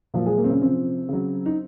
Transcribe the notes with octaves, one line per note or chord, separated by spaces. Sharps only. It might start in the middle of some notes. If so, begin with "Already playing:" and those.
A#2 F3 F#3 F4
G#3 G#4
A#3
C4
C#3 C#4
C3 F3 C4
C#3 F#3
D#4